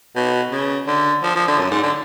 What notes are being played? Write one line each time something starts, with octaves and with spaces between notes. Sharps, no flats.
B2
C#3
D3
F3
F3
D3
F#2
G#2
D3